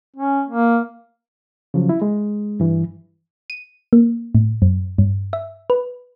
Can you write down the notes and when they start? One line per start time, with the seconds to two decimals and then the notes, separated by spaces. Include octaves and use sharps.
0.16 C#4
0.48 A#3
1.74 C#3 F3 F#3
1.89 E4
2.02 G#3
2.60 G2 E3
3.50 D#7
3.93 A#3
4.35 A2
4.62 F#2
4.98 G2
5.33 E5
5.70 B4